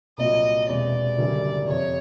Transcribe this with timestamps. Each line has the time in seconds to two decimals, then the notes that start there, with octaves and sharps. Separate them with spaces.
0.18 C2 A#2 F#3 D#5
0.68 E1 E2 C3 D5
1.17 F#1 F#2 D3 G3
1.67 F2 C3 F3 C#5